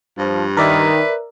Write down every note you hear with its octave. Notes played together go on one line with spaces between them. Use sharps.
G2 F3
D#3 A#4 B4 D5 E5